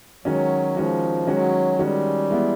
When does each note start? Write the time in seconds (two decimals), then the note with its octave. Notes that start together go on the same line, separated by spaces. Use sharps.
0.24 D#3 F#3 G#3 C#4 F#4
0.76 D#3 F3 G#3 C#4 F#4
1.27 D#3 F#3 G#3 C#4 F#4
1.79 D#3 G3 G#3 C#4 F#4
2.30 E3 G#3 B3 E4